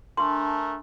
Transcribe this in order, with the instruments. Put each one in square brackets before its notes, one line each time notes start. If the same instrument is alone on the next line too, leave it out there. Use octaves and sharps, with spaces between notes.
[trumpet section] A3 A#4 [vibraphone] D4 G#5 A5 [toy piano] C6